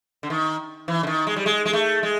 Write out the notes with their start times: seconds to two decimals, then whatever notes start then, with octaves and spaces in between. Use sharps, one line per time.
0.23 D3
0.30 D#3
0.88 E3
1.03 D3
1.07 D#3
1.27 G#3
1.36 G3
1.46 G#3
1.66 G#3
1.73 A3
2.03 G#3